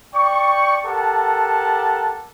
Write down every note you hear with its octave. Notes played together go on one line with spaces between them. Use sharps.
D5 G5 C#6
G4 A4 A#4 F#5 A5